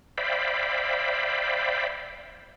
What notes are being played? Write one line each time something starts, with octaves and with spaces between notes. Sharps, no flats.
C5 D5 E5 F5 G5 B5